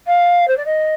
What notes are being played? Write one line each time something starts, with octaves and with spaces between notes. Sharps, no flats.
F5
C5
D5
D#5